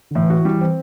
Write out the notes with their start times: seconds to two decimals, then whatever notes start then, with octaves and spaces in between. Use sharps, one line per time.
0.11 D3
0.15 A2 E3
0.30 F#4
0.45 G3
0.61 C4